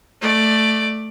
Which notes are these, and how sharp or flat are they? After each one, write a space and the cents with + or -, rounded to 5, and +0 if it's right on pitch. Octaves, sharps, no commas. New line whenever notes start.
A3 +0 D5 +10